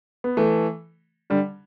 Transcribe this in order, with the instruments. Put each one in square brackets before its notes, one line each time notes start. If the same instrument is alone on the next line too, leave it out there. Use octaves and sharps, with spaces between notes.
[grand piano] B3
E3 A3
D3 G3